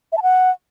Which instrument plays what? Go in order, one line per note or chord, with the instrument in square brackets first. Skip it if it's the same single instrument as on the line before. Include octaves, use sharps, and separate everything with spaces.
[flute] E5
A5
F#5